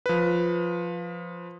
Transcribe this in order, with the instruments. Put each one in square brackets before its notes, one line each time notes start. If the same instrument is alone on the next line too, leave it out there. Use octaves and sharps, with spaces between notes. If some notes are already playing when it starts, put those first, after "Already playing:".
[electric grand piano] F3 B4